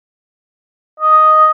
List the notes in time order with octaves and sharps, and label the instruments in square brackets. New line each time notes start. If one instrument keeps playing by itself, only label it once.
[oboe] D#5